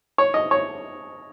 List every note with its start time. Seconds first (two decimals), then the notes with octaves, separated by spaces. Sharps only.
0.18 C#5
0.34 D#5
0.51 C#5